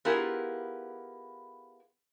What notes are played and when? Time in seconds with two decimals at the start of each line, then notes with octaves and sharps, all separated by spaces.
0.05 B3 E4 F4 G4 G#4 A#4